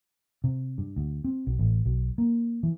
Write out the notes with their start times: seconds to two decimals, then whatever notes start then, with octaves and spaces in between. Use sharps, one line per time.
0.44 C3
0.78 G2
0.96 D2
1.24 C4
1.47 B1
1.59 A1
1.86 B1
2.18 A#3
2.63 E3